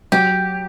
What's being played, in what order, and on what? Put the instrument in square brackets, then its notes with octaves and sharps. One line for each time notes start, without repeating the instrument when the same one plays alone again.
[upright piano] F#3 [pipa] G4